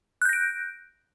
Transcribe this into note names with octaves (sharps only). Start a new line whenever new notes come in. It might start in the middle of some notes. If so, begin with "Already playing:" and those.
F#6 G6 A#6 D7